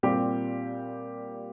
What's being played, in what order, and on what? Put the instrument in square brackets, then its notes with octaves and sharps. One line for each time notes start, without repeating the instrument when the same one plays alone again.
[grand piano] A#2 G3 C4 G4